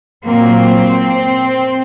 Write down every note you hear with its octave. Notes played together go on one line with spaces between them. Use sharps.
A#2 F#3 A#3 C4